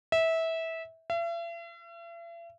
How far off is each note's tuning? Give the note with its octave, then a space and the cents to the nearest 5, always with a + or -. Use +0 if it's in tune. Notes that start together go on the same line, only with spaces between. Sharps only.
E5 -20
E5 +45